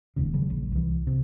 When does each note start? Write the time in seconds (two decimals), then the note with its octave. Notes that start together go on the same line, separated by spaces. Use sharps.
0.16 E1 D#2 C#3
0.34 C#3 F#3
0.50 A#1
0.72 C2 E3
1.07 C3